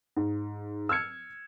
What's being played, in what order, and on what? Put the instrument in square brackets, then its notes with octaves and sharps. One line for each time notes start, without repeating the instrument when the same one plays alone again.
[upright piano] G#2
E6 F6 G#6 C#7